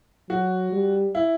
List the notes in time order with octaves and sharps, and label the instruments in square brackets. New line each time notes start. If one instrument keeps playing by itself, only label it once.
[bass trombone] F#3 [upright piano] F#4
[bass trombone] G3
[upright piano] E4